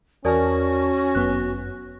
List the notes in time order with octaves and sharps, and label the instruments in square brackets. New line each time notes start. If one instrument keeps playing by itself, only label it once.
[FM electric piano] E2 A5 F6 [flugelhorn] C#4 [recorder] F#4 [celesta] A#4 D5 G#5
[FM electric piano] G1 F#2 B3 [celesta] F#6